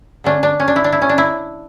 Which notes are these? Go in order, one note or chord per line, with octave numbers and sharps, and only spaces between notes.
D3 A3 C#4 D4
D4
C#4
D4
E4
D4
E4
C#4
D4
E4